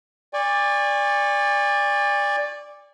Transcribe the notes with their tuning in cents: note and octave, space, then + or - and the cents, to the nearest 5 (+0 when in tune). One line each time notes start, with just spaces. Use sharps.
D5 +0 G#5 -40 C#6 -20